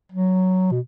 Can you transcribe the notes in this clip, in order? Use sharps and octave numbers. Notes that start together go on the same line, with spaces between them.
F#3
B2